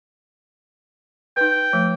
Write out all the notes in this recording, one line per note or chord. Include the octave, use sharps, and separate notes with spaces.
D#4 B4 G5
F3 A3